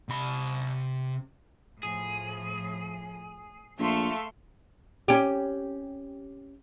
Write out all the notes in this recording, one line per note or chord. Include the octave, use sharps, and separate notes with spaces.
C3 B5
A2 F3 G#4
A#1 A3 E5 F5 C6 C#7
C#4 G4